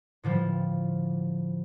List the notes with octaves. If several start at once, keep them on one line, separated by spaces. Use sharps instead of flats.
A2 D3 F3 G3